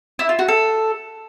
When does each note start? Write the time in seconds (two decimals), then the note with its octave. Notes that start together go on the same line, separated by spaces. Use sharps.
0.19 E4
0.29 F4
0.39 F#4
0.48 A4